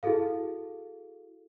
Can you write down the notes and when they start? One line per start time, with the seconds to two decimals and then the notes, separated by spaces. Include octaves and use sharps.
0.03 E4 F#4 G#4 A4 F5